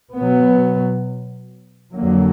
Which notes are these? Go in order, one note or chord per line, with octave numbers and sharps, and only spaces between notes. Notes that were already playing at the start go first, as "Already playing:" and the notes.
B2 F#3 B3
F2 D3 F#3 A#3